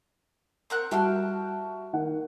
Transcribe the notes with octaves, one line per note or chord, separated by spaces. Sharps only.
C4 A#4 F#5
G3 F#4 E5 G5 A5 F6
D#3 F#5